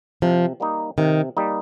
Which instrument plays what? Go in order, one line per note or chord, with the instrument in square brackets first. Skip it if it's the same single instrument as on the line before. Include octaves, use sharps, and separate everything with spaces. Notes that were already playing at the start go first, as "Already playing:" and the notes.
[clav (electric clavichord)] C3 [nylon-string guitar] F3
[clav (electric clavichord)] G3 A#3 D#4
[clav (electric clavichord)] C3 [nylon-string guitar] D#3
[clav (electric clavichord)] G3 A#3 D#4